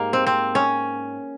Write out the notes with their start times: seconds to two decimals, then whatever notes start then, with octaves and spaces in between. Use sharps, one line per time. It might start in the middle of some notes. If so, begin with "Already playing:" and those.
Already playing: G#2 G3 A#3 D#4
0.13 C4
0.27 C4
0.55 C#4